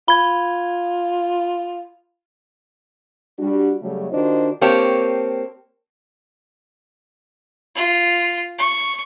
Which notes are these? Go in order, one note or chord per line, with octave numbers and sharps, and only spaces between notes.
F4 B5 G#6
G3 D4 F#4
C#3 F#3 G3 A3
D#3 D4 F4 F#4 C5 D#5
A#3 C4 G4 C#5 A5
F4
C#6